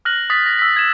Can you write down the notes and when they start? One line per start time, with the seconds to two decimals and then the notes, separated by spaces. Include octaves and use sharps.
0.05 F6 F#6 A#6 F#7
0.30 D#6 A6 B6
0.46 A#6
0.59 E6 B6
0.76 G#6 E7